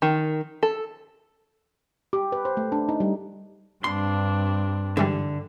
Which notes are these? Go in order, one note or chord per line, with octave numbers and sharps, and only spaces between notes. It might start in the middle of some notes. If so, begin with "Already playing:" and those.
D#3
A4
G4
B4
C5
A3
D4
D#4
G3
G2 C4 D4 C6
G#2 D3 E3 G3